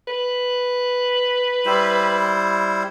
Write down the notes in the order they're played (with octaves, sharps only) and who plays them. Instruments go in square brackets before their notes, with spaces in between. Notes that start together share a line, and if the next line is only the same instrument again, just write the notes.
[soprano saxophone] B4
[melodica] G3 E4 C5